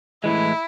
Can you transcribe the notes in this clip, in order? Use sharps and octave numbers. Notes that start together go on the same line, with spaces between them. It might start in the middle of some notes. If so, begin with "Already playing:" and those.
A2 E3 G#3 E4